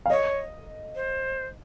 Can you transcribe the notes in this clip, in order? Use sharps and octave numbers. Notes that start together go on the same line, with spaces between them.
F5
C#5 D#5
C5